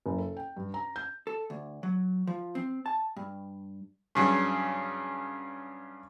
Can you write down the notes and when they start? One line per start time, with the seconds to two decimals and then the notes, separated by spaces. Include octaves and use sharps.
0.06 F#1
0.18 A4
0.36 G5
0.56 G2
0.74 A#5
0.96 G6
1.27 A4
1.50 D2
1.83 F#3
2.27 F3
2.55 C4
2.86 A5
3.16 G2
4.15 G2 C#3 F#3